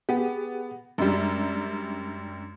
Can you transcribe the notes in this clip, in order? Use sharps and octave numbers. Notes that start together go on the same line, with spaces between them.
B3 G4 G#4
F#2 G3 G#3 D4